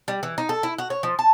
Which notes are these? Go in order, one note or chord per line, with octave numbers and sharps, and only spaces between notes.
G3
E3
D#4
A4
E4
F#4
C#5
F3
A5